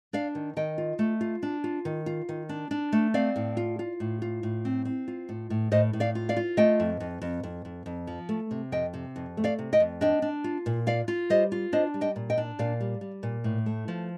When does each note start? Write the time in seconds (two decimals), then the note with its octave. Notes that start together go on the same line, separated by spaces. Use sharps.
0.13 D4 D5 F5
0.35 D#3
0.57 D#3 D#5 G5
0.78 F4
0.99 A3
1.21 F4
1.43 D4
1.64 F4
1.85 D#3
2.06 F4
2.29 D#3
2.49 D4
2.71 D4
2.92 A3
3.14 C4 D5 F5
3.36 A2
3.57 F4
3.79 F4
4.00 A2
4.22 F4
4.43 A2
4.65 C4
4.85 C4
5.08 F4
5.29 A2
5.50 A2
5.72 A2 C5 D#5
5.93 A2
6.00 D5 F5
6.15 F4
6.29 D5 F5
6.37 F4
6.57 A3 D#5 G5
6.80 F2
7.00 F2
7.22 F2
7.43 F2
7.65 F2
7.86 F2
8.07 F3
8.29 A3
8.51 C3
8.72 F2 D#5 G5
8.94 C3
9.16 F2
9.37 A3
9.44 D5 F5
9.59 C3
9.73 D#5 G5
9.80 F2
10.01 D4 D#5 G5
10.22 D4
10.44 F4
10.66 A#2
10.87 F4 D5 F5
11.08 F4
11.30 G3 C5 D#5
11.52 F4
11.73 D4 C5 D#5
11.94 G3
12.01 D#5 G5
12.16 A#2
12.30 D#5 G5
12.37 D4
12.59 A#2 D5 F5
12.80 G3
13.01 G3
13.23 A#2
13.44 A2
13.66 A3
13.88 F3